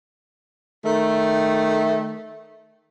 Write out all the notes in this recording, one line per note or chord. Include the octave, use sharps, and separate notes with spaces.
D#3 A3